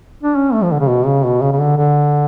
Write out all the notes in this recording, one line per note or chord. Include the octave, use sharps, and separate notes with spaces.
D4
C#4
A3
F3
D3
C#3
B2
C#3
B2
C#3
C#3
D3
D3